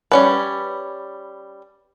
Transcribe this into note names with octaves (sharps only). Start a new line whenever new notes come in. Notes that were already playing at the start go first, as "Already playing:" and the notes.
G3 C#4 B4